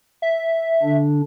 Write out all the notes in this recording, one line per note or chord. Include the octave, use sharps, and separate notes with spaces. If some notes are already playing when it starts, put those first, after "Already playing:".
E5
D3 D4